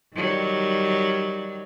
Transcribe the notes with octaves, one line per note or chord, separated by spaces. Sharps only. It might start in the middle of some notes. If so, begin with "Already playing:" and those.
D#3 F#3 G3